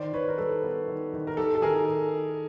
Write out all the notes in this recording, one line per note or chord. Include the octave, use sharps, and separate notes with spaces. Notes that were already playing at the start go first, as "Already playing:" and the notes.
Already playing: D#3 C5 D5
D#3 B4 C#5
A#4
G3 A4 B4
B3
D#3
D#3
A#4
D#3 G4 A4
A4
D#3 G#4 A#4